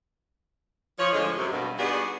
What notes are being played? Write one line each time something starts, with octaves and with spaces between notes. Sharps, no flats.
F3 C#5
A2 D3 F3 G#3
F#2 C3
G2 B2
G3 B3 D4 D#4 F#4 G#4